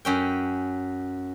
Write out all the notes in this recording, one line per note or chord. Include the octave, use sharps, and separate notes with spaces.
F#2 C#4 G5